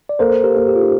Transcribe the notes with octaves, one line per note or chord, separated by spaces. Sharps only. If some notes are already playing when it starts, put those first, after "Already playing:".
D5
A#3 A4 C5
G4 A#4
A#3
G4
F4
D#4 G4